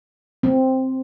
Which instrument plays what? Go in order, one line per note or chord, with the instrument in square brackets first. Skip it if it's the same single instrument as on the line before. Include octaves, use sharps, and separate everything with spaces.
[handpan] C4